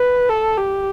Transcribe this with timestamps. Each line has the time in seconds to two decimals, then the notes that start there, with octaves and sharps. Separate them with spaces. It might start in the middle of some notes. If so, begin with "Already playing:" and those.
Already playing: B4
0.29 A4
0.57 G4